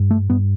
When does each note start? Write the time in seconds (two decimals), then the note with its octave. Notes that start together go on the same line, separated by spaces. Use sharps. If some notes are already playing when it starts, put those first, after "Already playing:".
Already playing: G2
0.11 A3
0.30 G2 B3